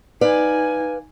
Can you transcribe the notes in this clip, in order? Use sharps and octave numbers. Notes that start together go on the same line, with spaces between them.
D#4 B4 D5 F5 G#5